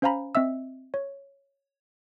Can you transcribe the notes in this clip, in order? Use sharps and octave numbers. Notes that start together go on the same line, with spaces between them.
C#4 C5 F5 G#5 A#5 B5
C4 D#5 E5 E6
C#5